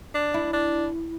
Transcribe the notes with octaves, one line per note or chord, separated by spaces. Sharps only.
D4
E4
D4